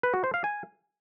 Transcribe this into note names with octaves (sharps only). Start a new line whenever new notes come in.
B4
F#4
C5
F5
G#5